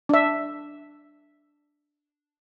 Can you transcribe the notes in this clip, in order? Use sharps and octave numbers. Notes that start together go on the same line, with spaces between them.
D4 E5